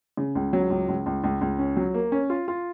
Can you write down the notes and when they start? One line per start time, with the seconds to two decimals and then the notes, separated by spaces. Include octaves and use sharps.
0.17 C#3
0.35 C#2
0.53 F#3
0.70 C#2
0.88 C#2
1.06 C#2
1.24 C#2
1.41 C#2
1.59 C#4
1.77 F#3
1.94 A#3
2.12 C#4
2.30 F4
2.48 F4